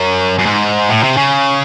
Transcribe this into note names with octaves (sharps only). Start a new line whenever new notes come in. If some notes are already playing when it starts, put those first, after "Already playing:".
Already playing: F#2
F#2
G#2
A2
C3
C#3